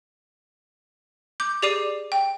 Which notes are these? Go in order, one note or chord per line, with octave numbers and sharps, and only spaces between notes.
D6 G6
G4 G#4 D5 D6 C7 D#7
G5